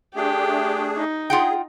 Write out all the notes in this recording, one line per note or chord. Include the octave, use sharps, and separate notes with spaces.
A3 D4 G4 G#4
D#4
F4 G#4 F#5 G5